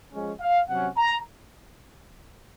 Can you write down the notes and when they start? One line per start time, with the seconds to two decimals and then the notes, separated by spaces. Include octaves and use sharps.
0.12 F3 G#3 C#4
0.40 F5
0.68 C3 F#3 C#4 F#5
0.97 A#5